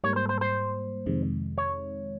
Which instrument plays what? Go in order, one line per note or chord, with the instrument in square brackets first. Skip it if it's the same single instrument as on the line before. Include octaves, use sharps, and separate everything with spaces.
[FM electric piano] G#2 G3 A#3 [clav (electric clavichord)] C#5
[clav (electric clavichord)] C5
C5
C5
[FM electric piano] F2 C3 D#3 G#3
[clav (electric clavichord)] C#5